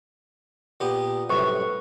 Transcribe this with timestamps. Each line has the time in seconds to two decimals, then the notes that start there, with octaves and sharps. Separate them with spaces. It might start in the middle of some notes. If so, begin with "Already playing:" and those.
0.80 A#2 B3 G4
1.30 C2 F#2 A2 B4 C#6